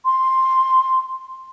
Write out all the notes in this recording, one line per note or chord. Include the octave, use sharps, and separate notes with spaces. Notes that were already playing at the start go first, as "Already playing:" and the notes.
C6